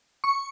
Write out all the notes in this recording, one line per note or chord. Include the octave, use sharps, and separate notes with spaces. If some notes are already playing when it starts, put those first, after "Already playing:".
C#6